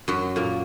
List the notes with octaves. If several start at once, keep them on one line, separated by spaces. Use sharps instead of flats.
F#2 F#3
A#2 A#3